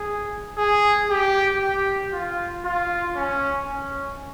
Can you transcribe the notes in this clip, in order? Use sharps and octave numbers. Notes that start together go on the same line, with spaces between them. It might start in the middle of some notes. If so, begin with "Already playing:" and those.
Already playing: G#4
G#4
G4
G4
F4
F4
C#4
C#4